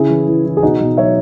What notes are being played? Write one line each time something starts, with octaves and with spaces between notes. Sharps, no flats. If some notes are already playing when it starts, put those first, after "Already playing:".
Already playing: C#3 E4 G#4
E3
E3
E3
G#4
B2 D#4 F#4
B2
F#3 C#5 E5